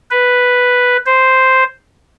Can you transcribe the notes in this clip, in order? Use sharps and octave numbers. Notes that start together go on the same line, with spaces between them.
B4
C5